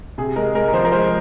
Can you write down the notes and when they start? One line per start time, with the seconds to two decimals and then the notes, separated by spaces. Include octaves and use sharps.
0.18 C3 G#4
0.36 G#3 A#4
0.55 G#3 A#4
0.68 A#4
0.74 F3 C5
0.84 A#4
0.92 G#3 C5